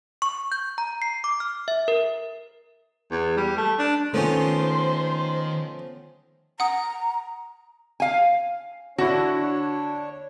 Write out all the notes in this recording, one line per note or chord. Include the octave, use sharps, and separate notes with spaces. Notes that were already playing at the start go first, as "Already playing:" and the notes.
C#6
G6
A#5
C7
D6
F6
E5
A#4
E2
G3
A3
D4
D#3 F3 A3 B3 C#4 C5 C6
F#5 A#5 D#6
F5 G#5
D3 D4 E4 F#4 C#5